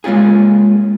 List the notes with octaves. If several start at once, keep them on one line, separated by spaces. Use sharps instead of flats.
G#3 A#3 C#4 F4 G#4